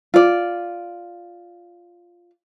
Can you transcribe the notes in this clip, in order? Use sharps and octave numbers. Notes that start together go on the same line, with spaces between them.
F4 D5